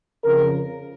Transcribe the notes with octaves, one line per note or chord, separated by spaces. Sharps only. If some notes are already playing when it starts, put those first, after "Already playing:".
F2 C#3 F3 A#4